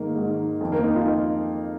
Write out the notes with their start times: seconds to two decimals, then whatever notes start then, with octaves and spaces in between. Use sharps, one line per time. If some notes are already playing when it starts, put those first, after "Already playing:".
Already playing: G#2 D#3 A#3
0.15 G#2 D#3
0.61 F2 D#3
0.72 A#3
0.83 D#4
0.96 F4